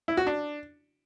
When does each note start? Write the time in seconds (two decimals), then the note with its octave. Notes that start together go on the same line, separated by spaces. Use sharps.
0.08 E4
0.17 F#4
0.27 D4